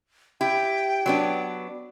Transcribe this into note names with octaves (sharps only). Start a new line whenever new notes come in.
E4 G4 G5
F#3 B3 D4